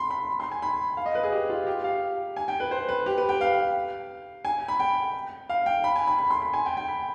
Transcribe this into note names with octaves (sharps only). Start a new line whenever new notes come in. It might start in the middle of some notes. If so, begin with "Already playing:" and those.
Already playing: B5 C6
B5
C6
G#5
B5
F5
D#5
B4
G#4
G4
F4
G4
F5
G#5
G5
B4
C5
B4
G4
B4
G5
F5
G#5
B5
G5
F5
G5
B5
G#5
B5
B5
C6
B5
G#5
G5
G5
B5